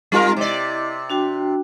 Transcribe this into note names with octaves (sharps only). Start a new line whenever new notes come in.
G3 G#3 C4 D#4 F4 A#4
C3 E4 D5 D#5 D6
D4 F#4 G5